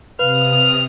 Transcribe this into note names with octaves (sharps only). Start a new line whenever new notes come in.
C3 B4 F5 D#6 F7